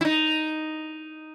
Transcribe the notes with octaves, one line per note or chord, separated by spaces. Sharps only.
E4
D#4